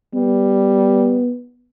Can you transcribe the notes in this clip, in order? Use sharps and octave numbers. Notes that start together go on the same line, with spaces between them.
G3 B3